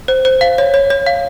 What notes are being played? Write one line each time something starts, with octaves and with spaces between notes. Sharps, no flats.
C5
C5
F5
C#5
C#5
C#5
F5